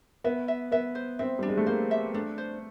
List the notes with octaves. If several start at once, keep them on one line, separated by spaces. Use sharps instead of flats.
B3 E5
E5
B3 E5
C5
C4 E5
G3 D4
G#3
A3
A#3 C5
E5
A3 D4
C5